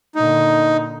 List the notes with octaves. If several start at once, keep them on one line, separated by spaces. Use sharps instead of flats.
A#2 D3 D#4